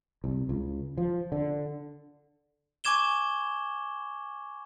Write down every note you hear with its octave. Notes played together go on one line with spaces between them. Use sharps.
C2
C#2
F3
D3
G#5 C#6 D6 G#6 E7 G7